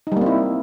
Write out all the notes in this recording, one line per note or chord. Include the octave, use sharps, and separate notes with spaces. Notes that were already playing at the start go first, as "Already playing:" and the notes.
G3 A#3 C4 D#4 E4